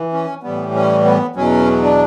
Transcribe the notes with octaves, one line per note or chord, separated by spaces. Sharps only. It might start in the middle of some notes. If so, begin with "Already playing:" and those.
Already playing: E3
C#4
A2 E3 G3 B3
C#4
B3
E2 B2 F#3 C#4
D4